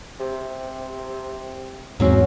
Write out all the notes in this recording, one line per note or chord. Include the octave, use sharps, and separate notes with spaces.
C3
E2 G#2 F#3 C4 C#4 F#4